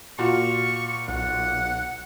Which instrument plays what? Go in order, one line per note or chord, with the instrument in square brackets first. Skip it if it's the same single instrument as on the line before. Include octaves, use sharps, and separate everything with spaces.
[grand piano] A#2 F4 F#4 [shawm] C#6
[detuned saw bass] B1 [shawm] F#5